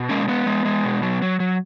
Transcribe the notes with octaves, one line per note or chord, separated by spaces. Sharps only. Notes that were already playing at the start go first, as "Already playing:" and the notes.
Already playing: B2
G#3 A#3 C#4
G#3 B3
G#3
G#3
B2
F#3
F#3
F#3